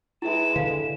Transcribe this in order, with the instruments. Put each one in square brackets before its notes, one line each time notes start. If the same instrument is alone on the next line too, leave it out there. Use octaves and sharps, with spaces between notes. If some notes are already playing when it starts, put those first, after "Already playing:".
[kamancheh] G#3 B4 [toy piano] E4 E5 [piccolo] E7
[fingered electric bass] D3 [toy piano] F5